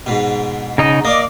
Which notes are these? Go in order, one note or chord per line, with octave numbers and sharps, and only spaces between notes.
G#2 B2
C#3 D#4 D#5
A#3 D5 D#5 D#6